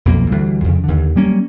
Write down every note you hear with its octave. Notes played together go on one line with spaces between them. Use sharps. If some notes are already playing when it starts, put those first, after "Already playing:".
B1 F2 A#3
D2 E3 G3
F2 C#3
D#2 D3
F#3 G3 A#3 C#4